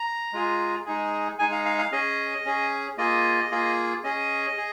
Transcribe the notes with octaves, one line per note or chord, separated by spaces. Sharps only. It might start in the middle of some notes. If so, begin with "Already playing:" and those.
Already playing: A#5
G#3 F4 G#4
G#3 D#4 G#4
G#3 D#4 G#4 G#5
F5
F5
F5
C#4 G#4 D#5
C#4 G#4
A#3 F4 G#4 D#5
A#3 F4 G#4
C#4 G#4 D#5
G#4